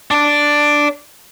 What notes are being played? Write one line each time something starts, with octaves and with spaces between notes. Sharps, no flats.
D4 D5